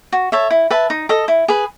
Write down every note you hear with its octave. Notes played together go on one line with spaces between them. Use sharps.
F#4
A4 C#5 E5
E4
B4 E5 A5
D#4
A4 D#5
E4
G#4 B4